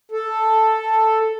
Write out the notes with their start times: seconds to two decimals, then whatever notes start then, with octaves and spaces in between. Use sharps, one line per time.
0.11 A4